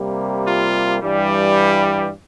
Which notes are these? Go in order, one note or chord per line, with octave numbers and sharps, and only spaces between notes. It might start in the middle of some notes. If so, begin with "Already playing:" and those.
Already playing: C3 G3 A#3
F4
G2 E3 G3